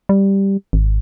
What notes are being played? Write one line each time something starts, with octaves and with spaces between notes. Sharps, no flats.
G3
G#1